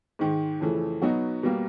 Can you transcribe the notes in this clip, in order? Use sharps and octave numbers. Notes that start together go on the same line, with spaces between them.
G#2 D#3 G#3
F2 C#3 E3 A3
B2 F#3 B3 D#4 F#4
B2 G3 A#3